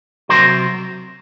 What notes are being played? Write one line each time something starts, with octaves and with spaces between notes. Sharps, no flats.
C3 D#3 F#3 A#4 C5